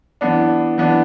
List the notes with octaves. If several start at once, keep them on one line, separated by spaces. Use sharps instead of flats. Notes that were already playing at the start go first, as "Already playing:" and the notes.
E3 B3 D4
E3 B3 D4